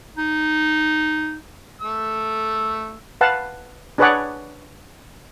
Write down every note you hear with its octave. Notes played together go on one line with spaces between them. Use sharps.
D#4
A3 E6
B4 F5 F#5 A5
D4 G#4 B4 C#5 D5 F#5